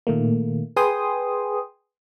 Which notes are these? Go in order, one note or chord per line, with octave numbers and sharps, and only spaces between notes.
A#2 D#3 A3 A#3
G#4 B4 G5 G#5 C6 D#6